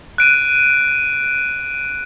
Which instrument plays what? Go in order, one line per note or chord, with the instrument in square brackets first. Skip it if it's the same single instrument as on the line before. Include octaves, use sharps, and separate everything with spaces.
[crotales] F#6 D7 D#7